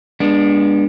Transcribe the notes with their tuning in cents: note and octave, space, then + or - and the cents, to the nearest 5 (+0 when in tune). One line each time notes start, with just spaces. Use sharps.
G#3 -25 B3 -30 D4 +0